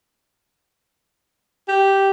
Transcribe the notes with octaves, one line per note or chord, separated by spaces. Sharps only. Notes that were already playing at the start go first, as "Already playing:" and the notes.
G4